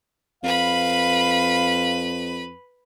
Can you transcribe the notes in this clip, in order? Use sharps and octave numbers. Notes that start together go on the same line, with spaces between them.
F2 B4 F5 B5